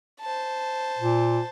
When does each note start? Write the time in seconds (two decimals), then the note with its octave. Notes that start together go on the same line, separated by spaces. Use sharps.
0.21 C5 A5
0.98 A#2